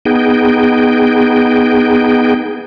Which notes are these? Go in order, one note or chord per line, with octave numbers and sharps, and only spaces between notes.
B3 D#4 G#4 G5